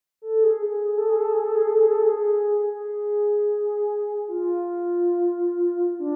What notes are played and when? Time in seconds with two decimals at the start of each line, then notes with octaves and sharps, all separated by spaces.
0.22 A4
0.44 G#4
0.65 G#4
0.86 G#4
0.98 A4
1.09 G#4
1.20 A4
1.33 G#4
1.44 A4
1.55 G#4
1.67 A4
1.80 G#4
1.91 A4
2.03 G#4
2.58 G#4
4.28 F4
5.99 D4